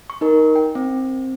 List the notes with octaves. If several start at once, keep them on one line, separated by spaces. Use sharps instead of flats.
C#6
D#4 A#4
G5
C4